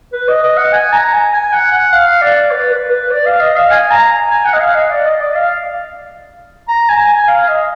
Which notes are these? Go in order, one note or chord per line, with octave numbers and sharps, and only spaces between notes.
B4
D#5
D#5
F#5
G#5
A#5
G#5
G#5
F#5
F#5
F5
D5
B4
B4
B4
D5
F5
D#5
F5
G#5
A#5
G#5
F#5
D#5
F5
D#5
D5
D#5
D5
F5
A#5
G#5
G#5
F5
D#5